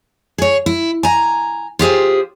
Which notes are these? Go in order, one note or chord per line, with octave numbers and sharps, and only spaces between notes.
G#4 C#5
E4
G#5 A#5
F4 G4 G#4 C5